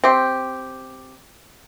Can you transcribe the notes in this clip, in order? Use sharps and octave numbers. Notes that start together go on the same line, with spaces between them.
C4 G4